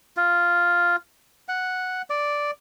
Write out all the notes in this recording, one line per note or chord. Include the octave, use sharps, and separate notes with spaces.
F4
F#5
D5